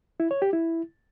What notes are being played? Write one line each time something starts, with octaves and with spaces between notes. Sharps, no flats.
E4
C#5
G4
E4